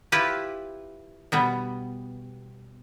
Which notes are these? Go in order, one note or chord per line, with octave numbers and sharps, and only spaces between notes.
E4 F4 G4 B4
B2 G3 B3